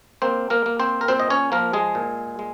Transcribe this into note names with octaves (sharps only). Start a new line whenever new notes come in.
A#3 C4 C5
A#3 A#4
A#3
C4 C5
A#4
A#2 C4 C5
D#5
C#4 C#5
F3 A#3 A#4
G#3 G#4
A#2
G#3